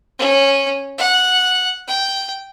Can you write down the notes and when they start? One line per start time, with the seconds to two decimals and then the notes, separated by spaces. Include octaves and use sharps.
0.19 C#4
0.98 F#5
1.87 G5